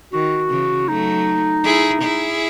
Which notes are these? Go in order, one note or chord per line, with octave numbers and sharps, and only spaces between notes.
D#3 F#4
C#3 E3
F#3 A3 D#4
E4 G#4
E4 G#4